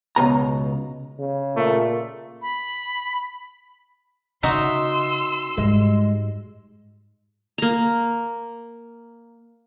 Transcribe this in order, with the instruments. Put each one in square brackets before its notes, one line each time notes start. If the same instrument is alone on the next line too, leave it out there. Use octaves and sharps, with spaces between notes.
[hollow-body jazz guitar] C#2 B2 A#5
[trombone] C#3
[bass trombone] A#2 [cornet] A3
[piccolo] B5
[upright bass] C#3 [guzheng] D#4 F#4 E5 [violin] C6 E6
[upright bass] G#2 G3 [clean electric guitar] G#3
[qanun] A#3 A#5